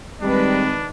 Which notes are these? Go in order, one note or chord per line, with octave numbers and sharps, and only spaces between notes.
D#3 G3 G#3 C4 D4 B4